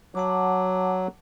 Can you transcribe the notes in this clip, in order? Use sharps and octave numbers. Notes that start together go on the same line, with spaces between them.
F#3 F#5 A5 D6